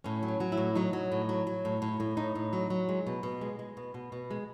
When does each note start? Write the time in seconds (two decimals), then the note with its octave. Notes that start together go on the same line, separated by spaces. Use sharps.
0.04 A2 C#4
0.23 F#3
0.28 C#4
0.40 F#3
0.52 E4
0.58 A2
0.75 F#3 D#4
0.93 F#3
1.12 A2
1.29 F#3
1.47 F#3
1.65 A2
1.82 A2
2.00 A2
2.17 A2 D#4
2.35 A2
2.53 F#3
2.70 F#3
2.89 G#3
3.07 B2
3.23 B2
3.41 G#3
3.59 G#3
3.77 B2
3.94 B2
4.12 B2
4.31 G#3